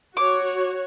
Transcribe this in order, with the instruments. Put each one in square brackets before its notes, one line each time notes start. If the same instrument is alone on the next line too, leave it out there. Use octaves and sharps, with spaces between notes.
[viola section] F#4 C#5 [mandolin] D6